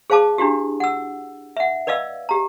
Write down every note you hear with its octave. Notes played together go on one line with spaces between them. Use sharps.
G#4 C5 F5 A5 D6
D4 E4 F#4 G4
F#5 E6
E5 F#5
B4 D5 D#5 F5 E6
G4 A#5